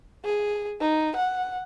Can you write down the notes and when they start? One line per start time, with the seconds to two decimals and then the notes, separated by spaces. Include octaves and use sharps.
0.25 G#4
0.81 D#4
1.16 F#5